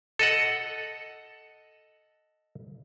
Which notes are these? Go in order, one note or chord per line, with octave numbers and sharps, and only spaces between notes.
A4 D#5 F#5